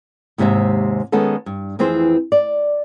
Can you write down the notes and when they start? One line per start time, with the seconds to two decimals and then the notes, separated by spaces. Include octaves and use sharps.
0.38 D#2 G#2 C3 G#3 E5
1.12 D#3 G#3 B3 C#4 A4
1.46 G2
1.79 F2 E3 C4 G#4 B4 C5
2.32 D5